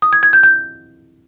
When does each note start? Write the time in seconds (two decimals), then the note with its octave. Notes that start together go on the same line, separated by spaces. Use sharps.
0.02 D#6
0.13 G#6
0.23 G#6
0.33 G6
0.43 G6